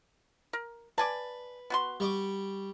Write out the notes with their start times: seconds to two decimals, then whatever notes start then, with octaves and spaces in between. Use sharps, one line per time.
0.53 A#4
0.98 B4 D5 G#5 A5
1.70 B3 F#4 C6
2.00 G3 C#6 D6